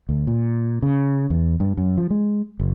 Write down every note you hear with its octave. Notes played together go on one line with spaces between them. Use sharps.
D2
A#2
C#3
E2
G2
F#2
F3
G#3
F#1